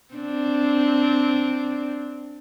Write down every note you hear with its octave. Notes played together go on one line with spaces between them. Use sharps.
C4 D4